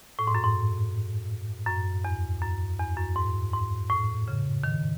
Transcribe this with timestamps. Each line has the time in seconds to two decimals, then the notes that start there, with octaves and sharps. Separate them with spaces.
0.19 A2
0.27 G#2
0.35 F#2
0.44 G#2
1.67 F#2
2.05 E2
2.42 F#2
2.79 E2
2.96 F#2
3.16 G#2
3.53 G#2
3.90 A2
4.28 C#3
4.64 D#3